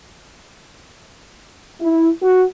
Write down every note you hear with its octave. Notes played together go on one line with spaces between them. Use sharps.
E4
F#4